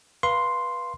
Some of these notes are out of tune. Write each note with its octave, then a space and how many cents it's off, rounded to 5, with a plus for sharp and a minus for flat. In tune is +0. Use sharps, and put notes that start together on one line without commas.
B4 -20 F5 -10 C6 +0